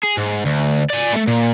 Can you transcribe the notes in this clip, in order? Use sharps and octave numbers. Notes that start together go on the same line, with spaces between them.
G#4
G#2
D2
D5 G#5
A2 A3
A#2